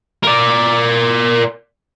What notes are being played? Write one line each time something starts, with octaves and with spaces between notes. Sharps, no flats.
A#4 D5